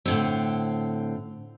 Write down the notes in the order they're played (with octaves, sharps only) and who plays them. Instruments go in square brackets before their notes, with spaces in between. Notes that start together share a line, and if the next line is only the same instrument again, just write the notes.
[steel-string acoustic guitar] A2 D3 C4